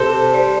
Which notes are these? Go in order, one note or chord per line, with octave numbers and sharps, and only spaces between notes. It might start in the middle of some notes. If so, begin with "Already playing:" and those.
Already playing: C3 A4 C5
G3